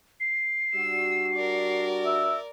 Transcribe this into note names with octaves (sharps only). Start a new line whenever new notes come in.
C7
G3 D4 F#4 E6
A#4 D5
E5